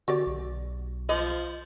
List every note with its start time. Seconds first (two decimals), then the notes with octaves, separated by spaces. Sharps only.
0.08 D3 F#4 G4 D5
0.27 B1
1.09 F3 D#5